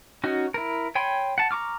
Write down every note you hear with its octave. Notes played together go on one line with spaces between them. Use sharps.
C#4 D#4 F#4
E4 A#4
C#5 G5 G#5 B5 C6
F#5 A5
A#5 C#6 D6 F6